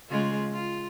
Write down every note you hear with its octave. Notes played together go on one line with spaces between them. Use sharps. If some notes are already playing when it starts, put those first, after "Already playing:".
C#3 G#3 F4
F4